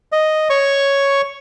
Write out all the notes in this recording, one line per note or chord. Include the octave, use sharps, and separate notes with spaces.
D#5
C#5 C#6